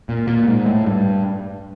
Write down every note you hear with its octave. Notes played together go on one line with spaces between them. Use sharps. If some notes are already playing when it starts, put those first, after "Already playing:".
A#2
A#2
G#2
A2
G2